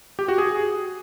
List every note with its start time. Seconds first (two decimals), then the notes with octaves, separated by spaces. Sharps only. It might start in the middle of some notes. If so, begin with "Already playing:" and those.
0.19 G4
0.28 F#4
0.38 G#4